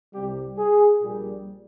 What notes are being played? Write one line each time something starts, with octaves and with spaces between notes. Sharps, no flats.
C2 C3 G3 G4
G#4
A#1 A#2 G3